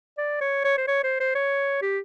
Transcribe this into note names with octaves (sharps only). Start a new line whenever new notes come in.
D5
C#5
C#5
C5
C#5
C5
C5
C#5
G4